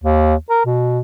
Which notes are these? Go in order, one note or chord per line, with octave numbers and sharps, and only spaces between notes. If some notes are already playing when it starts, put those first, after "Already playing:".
D#2
A#4
B2